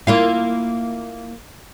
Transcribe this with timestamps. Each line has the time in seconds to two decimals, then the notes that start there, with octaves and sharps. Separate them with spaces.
0.07 A#3 E4 F4